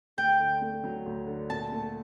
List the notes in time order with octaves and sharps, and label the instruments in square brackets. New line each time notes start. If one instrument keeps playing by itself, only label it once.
[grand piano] D2 [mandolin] G5
[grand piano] D3
A3
F#3
D2
D3
[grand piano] A#2 [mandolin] A5
[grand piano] A3